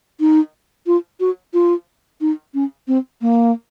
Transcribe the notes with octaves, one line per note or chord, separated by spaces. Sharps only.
D#4
F4
F#4
F4
D#4
C#4
C4
A#3